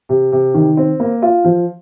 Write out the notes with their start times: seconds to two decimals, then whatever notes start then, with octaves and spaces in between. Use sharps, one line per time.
0.09 C3
0.32 C3
0.54 D#3
0.77 C4
1.00 A#3
1.22 F4
1.44 F3